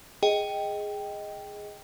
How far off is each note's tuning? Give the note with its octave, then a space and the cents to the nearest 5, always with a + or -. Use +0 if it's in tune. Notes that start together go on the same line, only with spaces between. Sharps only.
G#4 +0 D#5 +5 G5 +0